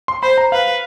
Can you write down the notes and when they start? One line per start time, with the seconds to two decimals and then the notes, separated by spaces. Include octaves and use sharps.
0.08 C6
0.22 C5 B5
0.38 A#5
0.52 B4 F5